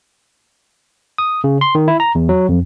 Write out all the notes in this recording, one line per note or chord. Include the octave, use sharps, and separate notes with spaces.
D#6
C#3
C6
D#3
E4
A#5
E2
F#3
F2